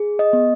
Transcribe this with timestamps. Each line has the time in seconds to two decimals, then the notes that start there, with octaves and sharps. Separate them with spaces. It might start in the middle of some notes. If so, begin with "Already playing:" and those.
Already playing: G#4
0.19 D#5
0.33 B3